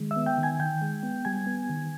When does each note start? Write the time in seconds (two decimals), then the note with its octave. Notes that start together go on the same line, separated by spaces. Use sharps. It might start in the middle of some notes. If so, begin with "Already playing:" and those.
Already playing: D#3 G#3
0.11 E5 E6
0.16 B3
0.26 G5 G6
0.38 D#3
0.43 G#5 G#6
0.59 D#3 G5 G6
0.82 G#3
1.03 B3
1.25 G3 G#5 G#6
1.46 B3
1.70 D#3